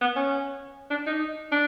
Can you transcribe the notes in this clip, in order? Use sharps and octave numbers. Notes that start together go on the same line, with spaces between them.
B3
C#4
D4
D#4
D4